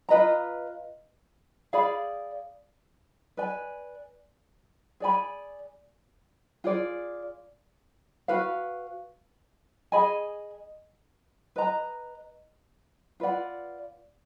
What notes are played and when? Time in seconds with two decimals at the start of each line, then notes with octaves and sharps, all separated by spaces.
0.09 F4 B4 D#5 A#5
1.73 G#4 D5 F5 B5
3.37 B4 D5 G#5
5.00 G#4 D5 G#5 B5
6.64 F4 G#4 D5
8.28 F#4 B4 F5
9.92 G#4 D#5 G#5 B5
11.56 B4 D#5 A#5
13.20 F4 B4 D5 F#5